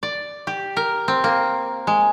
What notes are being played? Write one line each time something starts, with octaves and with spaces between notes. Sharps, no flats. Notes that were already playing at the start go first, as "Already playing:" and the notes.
D5
G4
A#4
C4
A#3
G#3